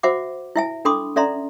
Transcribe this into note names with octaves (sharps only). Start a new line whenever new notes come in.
F#4 C5 E5 F#5 D6
E4 E5 G#5
D4 A4 B5 C6 D6 D#6
C#4 A4 D5 E5 A#5 C6